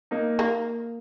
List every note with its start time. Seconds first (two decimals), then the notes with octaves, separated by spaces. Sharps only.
0.11 A#3 D#4
0.39 A#3